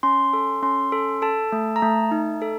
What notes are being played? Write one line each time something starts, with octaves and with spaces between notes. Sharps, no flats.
C#4 C6
A4
C#4 C6
A4
A4 A5
A3
A#5
A3 A5
D#4
A4